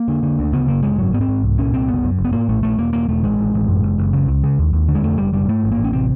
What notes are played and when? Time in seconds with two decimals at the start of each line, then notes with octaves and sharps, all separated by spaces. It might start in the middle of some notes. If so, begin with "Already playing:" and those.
Already playing: A#3
0.08 D3
0.23 D3
0.39 D2
0.53 C#3 B3
0.68 F#1 A#3
0.83 F#1 G#3
0.98 G#2 F#3
1.14 G#2 B3
1.21 C4
1.28 G#2
1.44 C2
1.58 A#2 C#4
1.73 C2 C4
1.88 F#1 B3
2.04 F#2
2.19 F#1
2.25 B3
2.33 A2 A#3
2.49 A#1 A3
2.63 A#1 A3
2.78 E1 A#3
2.93 E1 A#3
3.08 E1 A3
3.23 A1 G#3
3.39 A1
3.54 A1
3.69 F#2
3.83 F#1
3.98 F#1
4.13 C#3
4.28 C#2
4.44 C#3
4.59 D#2
4.73 D#2
4.89 D3
4.95 G#3
5.03 F2 A3
5.18 F#1 G3
5.33 F#1 G3
5.48 G#2 A3
5.64 A1
5.72 A#3
5.78 A1
5.84 C#4
5.93 C3 C4